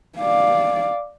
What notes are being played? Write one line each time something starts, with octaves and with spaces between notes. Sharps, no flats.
D5 F5